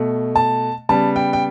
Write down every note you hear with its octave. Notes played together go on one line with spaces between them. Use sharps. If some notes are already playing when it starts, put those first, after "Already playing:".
Already playing: B2 A3
A5
C#3 G3 B3 A5
G5
G5